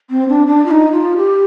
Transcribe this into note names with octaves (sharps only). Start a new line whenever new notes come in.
C4
D4
D4
F4
D#4
F4
G4